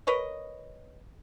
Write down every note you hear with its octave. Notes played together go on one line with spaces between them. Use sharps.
A#4 B4 C#5 D#5